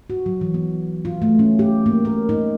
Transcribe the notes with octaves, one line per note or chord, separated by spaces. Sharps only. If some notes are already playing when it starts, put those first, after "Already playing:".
F#4
F#3
E3
B3
F4
A3
C#4
G4
A#3
A#4
D#4